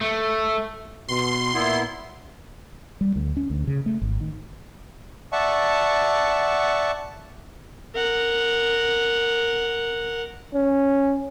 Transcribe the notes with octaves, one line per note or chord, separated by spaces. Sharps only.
A3
B2 C6
A#2 B3 E4
G3
D2
C#4
D2
C#3
A3
G#1
D#3
D5 E5 F#5 A5 C#6
A#4 F#5
C#4